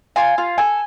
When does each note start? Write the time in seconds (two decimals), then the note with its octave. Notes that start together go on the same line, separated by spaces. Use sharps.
0.16 F4 G#5
0.38 F4
0.58 A4 G#5